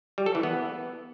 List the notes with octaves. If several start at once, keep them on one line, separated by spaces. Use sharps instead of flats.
G3
A4
E3
B3